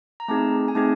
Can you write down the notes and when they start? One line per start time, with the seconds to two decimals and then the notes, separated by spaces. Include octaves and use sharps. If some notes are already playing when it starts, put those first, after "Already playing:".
0.20 A#5
0.28 A3 C4 D#4 G#4 A5
0.68 G#5
0.75 A3 C4 D#4 G#4 A5